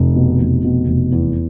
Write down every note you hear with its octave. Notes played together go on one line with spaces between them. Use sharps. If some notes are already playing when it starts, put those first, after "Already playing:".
Already playing: F1
B2
F1
B2
F1
E2